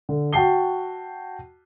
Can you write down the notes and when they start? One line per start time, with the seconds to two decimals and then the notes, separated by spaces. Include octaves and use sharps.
0.09 D3
0.33 F#4 G5 A5 C7 G7